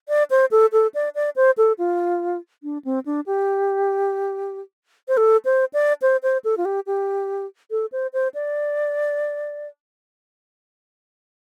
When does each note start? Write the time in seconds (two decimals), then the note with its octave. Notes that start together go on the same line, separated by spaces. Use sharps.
0.09 D5
0.31 C5
0.51 A4
0.72 A4
0.94 D5
1.15 D5
1.36 C5
1.58 A4
1.78 F4
2.63 D4
2.85 C4
3.06 D4
3.26 G4
5.08 C5
5.17 A4
5.45 C5
5.74 D5
6.02 C5
6.23 C5
6.45 A4
6.57 F4
6.65 G4
6.87 G4
7.71 A4
7.92 C5
8.13 C5
8.34 D5